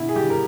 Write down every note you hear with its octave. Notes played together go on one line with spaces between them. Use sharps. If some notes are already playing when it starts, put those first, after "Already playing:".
Already playing: B2 E4
G#4
G3 G4
A#4